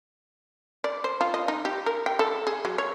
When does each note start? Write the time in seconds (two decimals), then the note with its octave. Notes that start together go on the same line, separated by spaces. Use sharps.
0.84 D5
1.04 C5
1.21 F4
1.34 D#5
1.48 D#4
1.65 G4
1.86 A#4
2.06 G5
2.19 A4
2.47 G#4
2.65 F#3
2.78 C#5